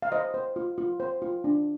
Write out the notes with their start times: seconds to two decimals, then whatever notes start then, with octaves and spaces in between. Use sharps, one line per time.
0.02 F5
0.12 C5 D#5
0.34 C5
0.56 F4
0.78 F4
1.00 C5
1.22 F4
1.44 D4